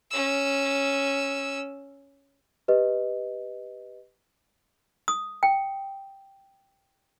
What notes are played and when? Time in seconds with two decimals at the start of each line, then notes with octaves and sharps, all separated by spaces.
0.11 C#4 E6
2.68 G4 B4 D#5
5.08 D#6
5.43 G5